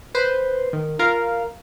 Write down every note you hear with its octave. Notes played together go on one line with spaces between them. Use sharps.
B4 C5
D#3
F4 A#4 F5